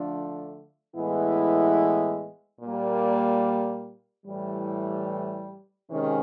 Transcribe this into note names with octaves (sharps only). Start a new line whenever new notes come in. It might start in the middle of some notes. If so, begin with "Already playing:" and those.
Already playing: D3 F3 A3 D4
A2 E3 G#3 B3 E4
A#2 G3 A#3
A2 E3 G3
C3 D#3 G#3 C#4